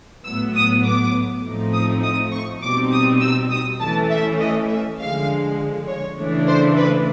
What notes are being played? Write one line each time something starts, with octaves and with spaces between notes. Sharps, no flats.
A2 F#3 B3 E6
D#6
D6
A2 F3 A3 C4 D#4
D#6
D#6
C#6
B2 G3 C4 D#4 D6
D#6
E6
D#6
E3 A3 C#4 A5
E5
D#5
E5
D3 F3 G#3 F5
C#5
C#3 E3 A3 D4
C5
B4